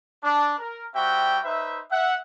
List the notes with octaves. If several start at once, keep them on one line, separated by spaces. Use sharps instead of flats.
D4
A#4
G3 C4 F#4 E5 G5
D#4 B4 C5 E5
E5 F#5